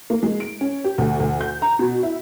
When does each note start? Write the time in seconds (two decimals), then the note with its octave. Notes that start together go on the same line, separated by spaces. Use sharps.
0.10 A#3
0.23 G#3
0.40 D7
0.61 C#4
0.84 G4
0.98 D2
1.20 D2
1.41 G6
1.62 A#5
1.79 B2
2.03 E4